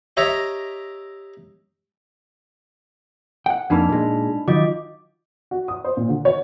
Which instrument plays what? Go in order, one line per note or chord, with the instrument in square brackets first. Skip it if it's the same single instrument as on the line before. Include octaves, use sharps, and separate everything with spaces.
[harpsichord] G4 C#5 D#5 E5 A#5
[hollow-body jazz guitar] F#5 G5
[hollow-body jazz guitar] F2 A#3 [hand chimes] D4 D#4 B5
[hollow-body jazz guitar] A#2 G#3
[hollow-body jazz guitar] D#3 F#3 [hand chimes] F4 D#5 D6
[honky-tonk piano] F#4
D#6
C5
A#2
D3
C#5